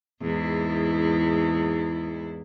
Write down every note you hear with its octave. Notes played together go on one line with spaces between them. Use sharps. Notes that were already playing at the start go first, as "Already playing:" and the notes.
E2 G#2 E4